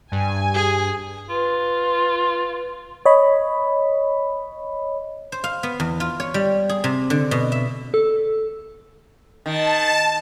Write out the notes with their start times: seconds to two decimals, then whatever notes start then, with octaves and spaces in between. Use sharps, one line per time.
0.12 G2 G#5
0.55 G#4
1.29 F4 B4
3.05 C#5 D#5 B5
5.32 C5
5.44 F5
5.63 B3
5.80 E2
6.00 F4
6.20 C#5
6.34 G3
6.69 G#4
6.84 C3
7.10 D3
7.31 B2
7.52 E5
7.94 A4
9.46 D#3 A5